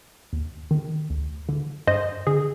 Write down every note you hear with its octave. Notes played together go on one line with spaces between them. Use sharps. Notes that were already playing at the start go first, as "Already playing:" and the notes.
D#2
D#3
D2
D3
G2 C5 D#5
D3 G#4